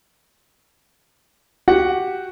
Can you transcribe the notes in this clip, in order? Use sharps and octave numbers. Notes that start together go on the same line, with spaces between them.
F#4 G4 F#5